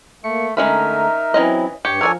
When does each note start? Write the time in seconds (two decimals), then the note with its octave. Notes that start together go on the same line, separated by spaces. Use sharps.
0.24 A3 A#3 C#7
0.57 D3 G#3 A3 C#4 D#4 A#4 E5 B5
1.34 E3 F#3 C4 C#4 E4 D#5
1.85 G2 G4 C#5 C#7
2.01 F3 D4 A4 A#4 C#5 D5 G#5